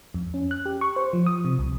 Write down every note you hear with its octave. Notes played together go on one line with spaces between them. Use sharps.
F2
C#4
F#6
G4
C#6
C5
F3
D#6
C3
C2